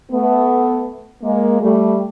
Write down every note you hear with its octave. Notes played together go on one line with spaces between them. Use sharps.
A3 B3
G#3 A#3
G3 A3